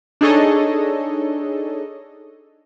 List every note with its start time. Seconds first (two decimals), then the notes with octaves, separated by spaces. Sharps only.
0.21 D4 D#4 G#4 A4 C#5 D#5